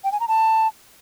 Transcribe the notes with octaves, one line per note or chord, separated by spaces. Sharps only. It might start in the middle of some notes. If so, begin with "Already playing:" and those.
G5
G#5
A#5
A5